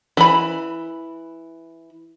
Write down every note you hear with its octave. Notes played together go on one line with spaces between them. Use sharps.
E3 B5